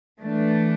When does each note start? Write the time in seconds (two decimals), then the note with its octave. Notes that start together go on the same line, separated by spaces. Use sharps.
0.20 E3 A3 D4